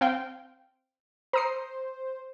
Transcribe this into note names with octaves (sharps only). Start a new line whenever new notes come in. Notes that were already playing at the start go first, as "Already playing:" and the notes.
C4 F5 G5
C5 A#5 D#6 C7